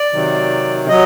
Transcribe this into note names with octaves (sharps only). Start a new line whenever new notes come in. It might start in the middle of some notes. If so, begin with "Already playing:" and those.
Already playing: D5
C3 D#3 F#3
F#3 D#5